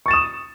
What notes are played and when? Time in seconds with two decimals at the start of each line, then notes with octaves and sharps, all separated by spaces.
0.06 C#6
0.08 A6
0.11 E7
0.13 D#6